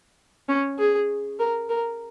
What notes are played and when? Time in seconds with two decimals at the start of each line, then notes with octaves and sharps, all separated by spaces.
0.49 C#4
0.79 G#4
1.39 A#4
1.70 A#4